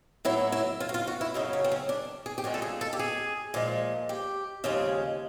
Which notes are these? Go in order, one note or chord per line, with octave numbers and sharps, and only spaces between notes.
A2 F#3 E4
E4
F4
F#4
F4
F#4
E4
F#2 C#3 F#3 D#4
C#4
C4
C#4
D4
G#4
G4
A#2 F3 G#3 F#4
A4
G#4
A4
G4
G#4
A#2 F3 G#3
G4
D#2 C#3 F3 G#3